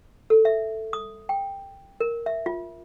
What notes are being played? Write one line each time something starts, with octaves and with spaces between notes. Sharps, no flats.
A4
E5
D#6
G5
A#4
E5
F4